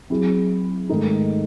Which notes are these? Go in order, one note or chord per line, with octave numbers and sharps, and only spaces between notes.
F#3 C4 E4 G#4
G#2 D#3 A3 D#4